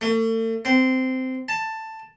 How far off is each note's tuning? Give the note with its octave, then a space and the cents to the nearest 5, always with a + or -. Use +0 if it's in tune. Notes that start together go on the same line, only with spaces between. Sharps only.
A3 +40
C4 -15
A5 +10